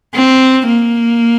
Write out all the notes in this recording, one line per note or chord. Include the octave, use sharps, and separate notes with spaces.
C4
A#3